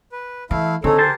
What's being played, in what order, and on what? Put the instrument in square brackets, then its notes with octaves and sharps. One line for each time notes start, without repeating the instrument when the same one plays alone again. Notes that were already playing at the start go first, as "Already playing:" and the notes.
[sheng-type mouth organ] B4
[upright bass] E3 [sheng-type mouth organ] A3 E4 F5
[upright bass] D3 [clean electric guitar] C4 [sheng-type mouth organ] D#4 G#4 C#5 [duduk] A4
[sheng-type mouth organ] G4 A#4 [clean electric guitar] G#4 C5 A5